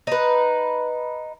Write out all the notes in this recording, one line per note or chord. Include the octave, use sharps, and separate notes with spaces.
D#4 B4